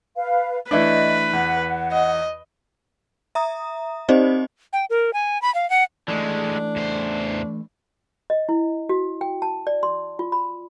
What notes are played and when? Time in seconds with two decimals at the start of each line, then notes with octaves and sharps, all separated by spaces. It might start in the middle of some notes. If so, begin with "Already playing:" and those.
0.17 B4 F5
0.71 E3 A3 D4 B4 D#5
1.33 E2 F#5
1.93 D#5
3.35 E5 A#5 D#6
4.09 C4 D#4 G4 C5 D5 D#5
4.73 G5
4.90 A#4
5.13 G#5
5.42 B5
5.55 F5
5.70 F#5
6.08 D3 E3 G#3 A3 D4
6.76 E2 C5
8.30 D#5
8.49 E4
8.89 F#4
9.21 G5
9.42 A5
9.67 D5
9.83 C6
10.19 F4
10.32 B5